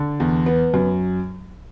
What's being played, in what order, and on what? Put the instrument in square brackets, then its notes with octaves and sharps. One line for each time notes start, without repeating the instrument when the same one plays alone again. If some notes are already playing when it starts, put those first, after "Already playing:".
Already playing: [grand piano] D3
E2
B3
F#2